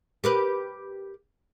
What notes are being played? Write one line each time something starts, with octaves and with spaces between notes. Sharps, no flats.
G4 A#4 B4